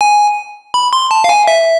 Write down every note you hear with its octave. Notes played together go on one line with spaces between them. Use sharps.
G#5
B5
C6
A5
F5
G#5
E5